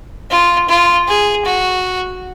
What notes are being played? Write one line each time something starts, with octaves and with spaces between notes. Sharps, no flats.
F4
F4
G#4
F#4